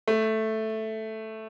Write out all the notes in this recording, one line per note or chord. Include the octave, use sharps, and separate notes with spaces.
A3